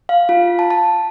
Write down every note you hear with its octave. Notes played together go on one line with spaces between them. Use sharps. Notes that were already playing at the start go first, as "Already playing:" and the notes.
F5
F4
A5
A5